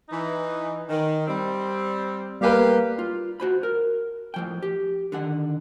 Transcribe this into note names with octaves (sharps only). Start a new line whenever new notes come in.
E3 D#4
D#3
G3 C4
G3 A#3 G4 B4 F5
F4
F#4 C5 B5
A#4
A2 F3 G5
G4
D3 D#3 F#5